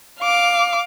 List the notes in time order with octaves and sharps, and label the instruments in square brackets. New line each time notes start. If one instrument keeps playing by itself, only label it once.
[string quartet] F5 D6